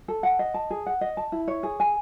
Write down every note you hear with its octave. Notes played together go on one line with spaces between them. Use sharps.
A4
F#5
D#5
A5
G#4
F#5
D#5
A5
E4
C#5
G#4
G#5